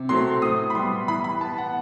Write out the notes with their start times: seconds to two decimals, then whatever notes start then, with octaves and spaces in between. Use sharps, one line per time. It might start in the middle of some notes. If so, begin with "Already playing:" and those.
Already playing: C3
0.09 F#3 A3 C4 C6
0.42 A2 D#6
0.70 B5
0.75 G3 B3 C6
1.08 E3 B5
1.24 B5
1.41 B3 A5
1.58 F#5